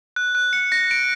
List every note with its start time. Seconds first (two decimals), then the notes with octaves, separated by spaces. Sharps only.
0.16 F#6
0.35 F#6
0.53 C#7
0.72 A#6
0.91 D7